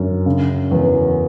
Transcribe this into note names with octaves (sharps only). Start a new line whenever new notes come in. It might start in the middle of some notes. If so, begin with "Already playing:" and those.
Already playing: F#2 D3
C#3
E2